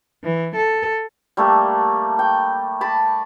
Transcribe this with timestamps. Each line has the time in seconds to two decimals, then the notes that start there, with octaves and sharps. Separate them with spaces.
0.24 E3
0.56 A4
1.37 G3 A3 A#3 A4
2.19 G5
2.81 A5 B5 D6